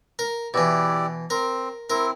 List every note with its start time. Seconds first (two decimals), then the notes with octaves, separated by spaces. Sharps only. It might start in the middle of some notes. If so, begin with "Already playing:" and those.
0.19 A#4
0.54 B2 E3 E4 G4 D5
1.30 C4 A#4
1.90 C4 E4 A#4